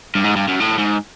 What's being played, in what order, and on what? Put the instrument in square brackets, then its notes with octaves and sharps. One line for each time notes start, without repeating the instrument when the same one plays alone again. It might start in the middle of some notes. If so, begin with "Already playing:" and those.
[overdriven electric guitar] G2
G#2
G2
F#2
A2
G#2